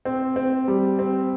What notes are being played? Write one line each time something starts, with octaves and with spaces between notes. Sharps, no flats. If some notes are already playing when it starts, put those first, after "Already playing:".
C4
C4
G3
C4